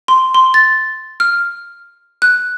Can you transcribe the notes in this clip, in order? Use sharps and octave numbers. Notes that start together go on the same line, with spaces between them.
C6
C6
A6
F6
F#6